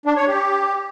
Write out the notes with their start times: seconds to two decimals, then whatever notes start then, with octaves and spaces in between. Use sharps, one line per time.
0.05 D4
0.17 C#5
0.28 G4